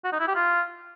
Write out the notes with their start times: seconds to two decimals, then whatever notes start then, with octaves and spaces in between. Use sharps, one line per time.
0.04 F#4
0.12 D#4
0.20 E4
0.28 G4
0.35 F4